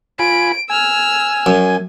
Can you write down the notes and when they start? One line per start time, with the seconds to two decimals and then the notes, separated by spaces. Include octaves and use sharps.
0.19 F4 G#5 B5 D7
0.70 G#5 E6 F6
1.46 F#2